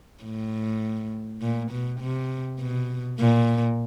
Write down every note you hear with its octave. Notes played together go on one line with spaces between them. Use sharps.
A2
A#2
B2
C3
B2
A#2